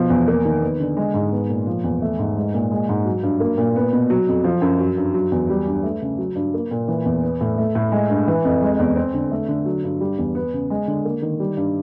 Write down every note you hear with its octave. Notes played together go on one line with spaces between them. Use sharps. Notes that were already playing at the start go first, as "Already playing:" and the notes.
Already playing: B2 F3
E2
A#3
D#3
B3
D3
G#3
G#2
B3
A#2
F3
E2
A3
G#2
G#3
A#2
G#3
G#2
F#3
G2
A#3
A#2
B3
B2
F#3
F2
F3
F#2
F#3
G2
F#3
E2
G3
G2
A3
C#3
F#3
G2
A#3
A#2
E3
E2
B3
A2
A3
A2
G#3
G2
E3
F2
G#3
E2
C4
D3
A3
D3
F#3
G2
G3
E2
B3
C#3
G#3
D3
A#3
D#3
G3
G2